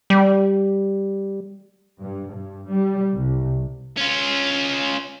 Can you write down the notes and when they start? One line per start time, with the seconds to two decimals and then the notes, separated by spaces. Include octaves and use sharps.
0.10 G3
1.99 G2
2.31 G2
2.68 G3
3.14 C2
3.97 C#4 F4